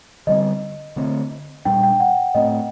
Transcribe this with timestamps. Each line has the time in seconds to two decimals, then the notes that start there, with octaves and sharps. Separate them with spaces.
0.27 D3 G3 C4 D#5
0.96 D3 A3 C4
1.65 A#2 G3 D4 G5
1.83 G5
2.00 F#5
2.34 A2 A3 C4 D#5